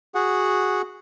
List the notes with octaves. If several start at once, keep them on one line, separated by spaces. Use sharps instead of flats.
F#4 G#4 F#5